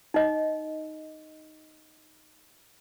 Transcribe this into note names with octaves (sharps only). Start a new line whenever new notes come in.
D#4 D#5